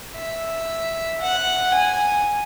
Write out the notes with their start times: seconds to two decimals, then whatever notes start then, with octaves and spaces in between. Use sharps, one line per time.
0.14 E5
1.21 F#5
1.74 G#5